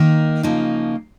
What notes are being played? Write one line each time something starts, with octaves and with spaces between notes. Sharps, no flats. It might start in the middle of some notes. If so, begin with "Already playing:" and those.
Already playing: D#3 A#3 D#4
C#3 F3 A#3 D#4